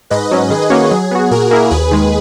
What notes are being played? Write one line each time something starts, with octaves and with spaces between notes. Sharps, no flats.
G#2 B4 D#5
F#3 C#4
D#3 G#4
A#3 C#4 F#4 C#5
F#3 G#4
B3 F#4
A#2 F#4 A#4
A#3 E4 G#4
D#2 G#4 B4
D#3 G#3